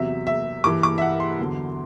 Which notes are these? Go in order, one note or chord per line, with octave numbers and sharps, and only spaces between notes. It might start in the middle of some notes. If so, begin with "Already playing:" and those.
Already playing: E2 C3 F#3 E5
E5
G2 E3 D6
D6
E5
F#5
C6
E2 D3 F#3